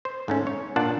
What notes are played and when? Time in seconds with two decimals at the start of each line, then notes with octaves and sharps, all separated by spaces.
0.05 C5
0.28 G#2 A3 C#4
0.47 C#5
0.76 A#2 D4 F4 D5 F#5 A5